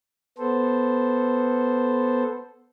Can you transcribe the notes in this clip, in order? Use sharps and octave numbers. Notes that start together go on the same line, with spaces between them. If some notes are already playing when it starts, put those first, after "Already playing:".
B3 A4 C5